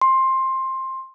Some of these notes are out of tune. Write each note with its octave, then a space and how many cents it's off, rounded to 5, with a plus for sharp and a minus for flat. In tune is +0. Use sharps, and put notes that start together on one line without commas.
C6 +15